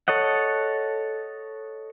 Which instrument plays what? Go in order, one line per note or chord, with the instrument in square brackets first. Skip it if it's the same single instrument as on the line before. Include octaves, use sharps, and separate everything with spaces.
[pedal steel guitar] A4 C#5 D#5 F#5